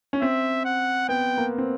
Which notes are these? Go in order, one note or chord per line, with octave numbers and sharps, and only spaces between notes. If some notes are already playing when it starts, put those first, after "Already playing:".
C#4
C4 E5
F#5
B3 G5
A#3
C4